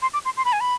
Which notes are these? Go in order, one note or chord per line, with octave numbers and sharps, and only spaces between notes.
C6
D6
C6
C6
B5
G#5
B5